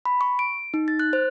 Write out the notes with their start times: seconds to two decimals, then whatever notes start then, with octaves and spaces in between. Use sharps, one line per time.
0.05 B5
0.21 C#6
0.39 D7
0.74 D#4
0.88 A6
0.99 F#6
1.13 C5